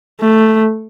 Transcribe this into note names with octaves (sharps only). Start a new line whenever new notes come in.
A3